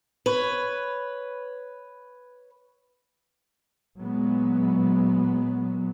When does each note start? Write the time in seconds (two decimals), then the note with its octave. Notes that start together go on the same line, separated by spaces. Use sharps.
0.26 B4 C#5
4.00 A#2 F#3 G#3 B3